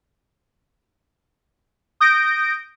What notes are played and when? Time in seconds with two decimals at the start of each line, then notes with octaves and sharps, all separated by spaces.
2.00 D#6 G6 A#6 D7